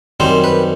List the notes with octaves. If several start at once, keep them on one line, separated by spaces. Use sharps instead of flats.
F#2 D#3 G3 C4 C5
B4